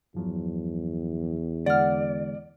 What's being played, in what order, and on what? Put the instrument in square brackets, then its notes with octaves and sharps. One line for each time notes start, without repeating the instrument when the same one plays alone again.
[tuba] E2 [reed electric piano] G2 F3 F#3
[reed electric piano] D3 G#3 [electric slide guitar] D5 [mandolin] F#5 F6